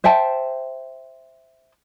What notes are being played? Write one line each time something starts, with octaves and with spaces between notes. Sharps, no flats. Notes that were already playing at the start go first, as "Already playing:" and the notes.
C5 E5 G5 A5